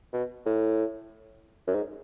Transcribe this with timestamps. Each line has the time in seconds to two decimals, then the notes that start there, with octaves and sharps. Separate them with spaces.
0.13 B2
0.46 A2
1.68 F#2
1.75 G#2